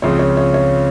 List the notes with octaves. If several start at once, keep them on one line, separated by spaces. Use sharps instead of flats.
C#2 C#3 F3 C4 C#5
C#5
C#5
C#5